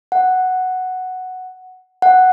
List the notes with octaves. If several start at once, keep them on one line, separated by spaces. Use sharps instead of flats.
F#5
F#5